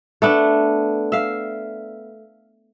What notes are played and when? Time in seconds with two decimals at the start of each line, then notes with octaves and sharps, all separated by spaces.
0.22 A3 B3 D4
1.12 E5 F5